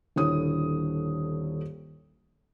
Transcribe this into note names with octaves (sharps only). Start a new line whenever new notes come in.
D#1 D3 E4 C#5 D#6